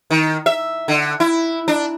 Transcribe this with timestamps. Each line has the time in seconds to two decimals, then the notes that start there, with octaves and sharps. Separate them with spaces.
0.10 D#3
0.46 E5
0.88 D3
1.20 E4
1.68 D4